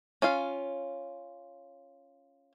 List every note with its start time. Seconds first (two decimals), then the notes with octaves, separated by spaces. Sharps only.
0.22 C#4 F4 F5